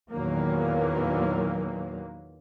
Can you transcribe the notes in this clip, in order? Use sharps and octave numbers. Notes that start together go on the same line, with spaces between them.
E2 A#2 D#3 F#3 A#3